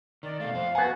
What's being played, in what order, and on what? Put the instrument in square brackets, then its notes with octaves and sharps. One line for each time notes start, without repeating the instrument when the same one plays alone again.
[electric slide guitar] D#3 [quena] D5
[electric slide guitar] B2 A3 [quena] F5
[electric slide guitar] F2 C5
[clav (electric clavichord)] B3 G#5 [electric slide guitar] F#4 F#5